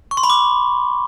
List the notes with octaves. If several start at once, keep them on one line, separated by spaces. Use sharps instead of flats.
C#6
C6
B5
D6